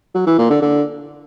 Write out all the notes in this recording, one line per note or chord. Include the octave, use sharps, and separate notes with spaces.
F#3
E3
A#2
D3
D3